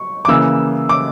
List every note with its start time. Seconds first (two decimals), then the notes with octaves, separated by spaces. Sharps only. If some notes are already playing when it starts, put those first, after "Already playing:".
Already playing: C#6
0.25 D6
0.28 C#3 E3 A#3 E6
0.89 D6